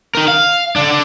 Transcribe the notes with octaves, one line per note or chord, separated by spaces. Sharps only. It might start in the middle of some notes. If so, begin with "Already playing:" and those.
D#4 A#4
F5
D3 D4